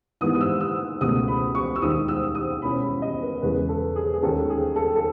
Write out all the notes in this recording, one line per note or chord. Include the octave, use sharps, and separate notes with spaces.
G#2 E3 B3 E4 D#6
D#6
E6
E6
C#2 B2 A3 D#6
B5
C#6
E6
D#2 D#3 G#3 D#4 D#6
E6
D#6
B2 G#3 C#4 E4 B5
B5
D#5
B4
E2 C#3 G#3 B4
A4
G#4
G#4
D#2 D#3 G#3 C#4 A4
G#4
A4
A4